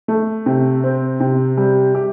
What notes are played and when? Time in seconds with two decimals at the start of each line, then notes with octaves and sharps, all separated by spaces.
0.08 A3
0.46 C3
0.84 C4
1.20 C3
1.57 G3
1.95 G4